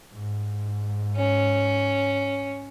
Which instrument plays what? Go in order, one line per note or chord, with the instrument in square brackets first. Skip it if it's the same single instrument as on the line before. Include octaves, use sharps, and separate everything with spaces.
[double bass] G#2
[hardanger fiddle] C#4